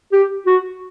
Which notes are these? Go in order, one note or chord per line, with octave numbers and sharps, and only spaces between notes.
G4
F#4